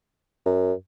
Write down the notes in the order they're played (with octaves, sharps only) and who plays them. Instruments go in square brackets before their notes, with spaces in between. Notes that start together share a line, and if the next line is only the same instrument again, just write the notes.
[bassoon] F#2